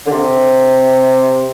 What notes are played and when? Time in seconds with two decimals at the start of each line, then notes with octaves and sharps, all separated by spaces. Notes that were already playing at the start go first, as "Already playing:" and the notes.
0.06 D3
0.11 C3